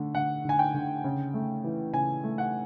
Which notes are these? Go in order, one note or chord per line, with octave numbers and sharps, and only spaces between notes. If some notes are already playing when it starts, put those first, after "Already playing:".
Already playing: D3 A3
D3 F#5
D3 G#5
G5
D3
C#3
A3
E3
C#3 G#5
A3
F#5